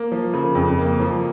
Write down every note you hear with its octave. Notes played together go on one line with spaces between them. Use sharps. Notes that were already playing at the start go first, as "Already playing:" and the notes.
Already playing: A#3
F3
C#3
F2
A#3
F3